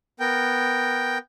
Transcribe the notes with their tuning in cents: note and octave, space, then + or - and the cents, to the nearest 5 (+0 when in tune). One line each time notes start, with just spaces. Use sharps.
B3 +0 A#4 +0 G5 +0